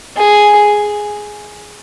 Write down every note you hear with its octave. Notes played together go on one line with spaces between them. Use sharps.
G#4